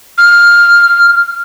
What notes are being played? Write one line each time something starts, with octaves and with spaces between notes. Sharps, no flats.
F6